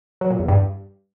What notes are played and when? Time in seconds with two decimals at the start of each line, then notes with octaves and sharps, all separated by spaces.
0.21 F#3
0.30 A#2
0.39 E2
0.48 G2